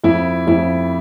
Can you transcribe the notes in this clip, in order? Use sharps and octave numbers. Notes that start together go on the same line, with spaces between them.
F2 E4
F2 E4